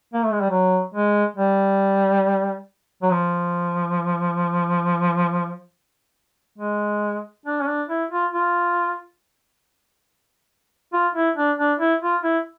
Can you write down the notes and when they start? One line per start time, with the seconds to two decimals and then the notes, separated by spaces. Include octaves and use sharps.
0.14 A#3
0.23 A3
0.32 G#3
0.41 G3
0.50 F#3
0.94 G#3
1.36 G3
3.02 F#3
3.11 F3
6.58 G#3
7.46 D4
7.61 C#4
7.67 D4
7.89 E4
8.11 F4
8.33 F4
10.93 F4
11.15 E4
11.37 D4
11.59 D4
11.80 E4
12.02 F4
12.23 E4